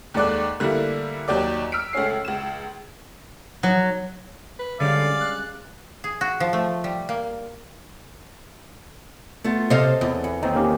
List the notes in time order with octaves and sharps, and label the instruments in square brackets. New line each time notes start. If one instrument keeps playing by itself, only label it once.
[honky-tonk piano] D#2 G#2 A4 D5 D6 F#6
D3 G3 A3 A#3 E4
D#2 F#3 G4 D5 D6
E6 F6 B6 D7
C#2 A3 C#4 C7
C#2 E7
[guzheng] F#3
[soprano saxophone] B4
[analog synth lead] D3 [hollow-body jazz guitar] G3 G#3 C#4 [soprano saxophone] D5 [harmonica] F5 D6
[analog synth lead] F#6
[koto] G#4
F#4
F3
A3
G3
A#3
[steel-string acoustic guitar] A3 B3 F4
[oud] C3 C5 F5 [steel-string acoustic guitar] A4 D#5 A5
[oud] E2
[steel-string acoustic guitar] E3
[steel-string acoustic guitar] D#2 [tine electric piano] C4 D#4
[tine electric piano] A#3 C#4 G4